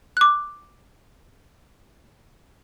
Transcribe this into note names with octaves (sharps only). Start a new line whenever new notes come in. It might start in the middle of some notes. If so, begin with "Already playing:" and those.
D6 F#6